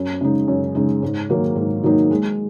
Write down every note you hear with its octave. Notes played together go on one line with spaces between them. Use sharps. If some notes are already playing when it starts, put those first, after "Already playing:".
Already playing: F#2
C#3 G#3 D#4
F#2
C#3 G#3 D#4
G#2
D#3 F#3 A#3 D#4
G#2
D#3 F#3 A#3 D#4
G#3